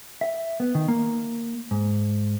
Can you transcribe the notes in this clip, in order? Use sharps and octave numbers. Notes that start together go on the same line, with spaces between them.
E5
B3
D#3
A#3
G#2